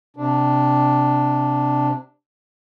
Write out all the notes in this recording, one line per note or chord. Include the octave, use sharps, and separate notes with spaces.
C3 D4